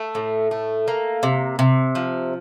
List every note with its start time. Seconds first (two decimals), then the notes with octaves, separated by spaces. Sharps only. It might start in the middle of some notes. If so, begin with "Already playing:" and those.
Already playing: A3
0.15 A2
0.51 A3
0.88 A#3
1.23 C3
1.59 C3
1.95 F3